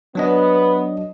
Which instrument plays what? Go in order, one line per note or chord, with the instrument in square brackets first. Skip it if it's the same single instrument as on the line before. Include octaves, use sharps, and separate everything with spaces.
[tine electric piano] F#3 D4 D#5 [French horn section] B3